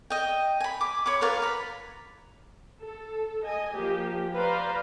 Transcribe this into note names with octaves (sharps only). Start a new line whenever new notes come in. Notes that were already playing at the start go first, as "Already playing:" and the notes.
D#5 G5
G#5 B5
D6
C#5 B5 D6
F4 A#4 B4 C#5
A#5 B5
A4
D#5 G#5
F3 A#3 G4
B4 C5 D5 F5 A#5